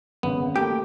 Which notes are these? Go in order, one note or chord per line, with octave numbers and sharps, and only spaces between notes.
G#1 C#3 B3
A3 A#3 G4 G5